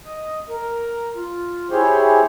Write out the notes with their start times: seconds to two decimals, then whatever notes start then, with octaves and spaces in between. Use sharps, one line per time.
0.06 D#5
0.49 A#4
1.16 F4
1.71 E4 G4 G#4 C5 C#5